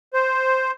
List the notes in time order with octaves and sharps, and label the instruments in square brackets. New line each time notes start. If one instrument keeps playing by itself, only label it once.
[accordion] C5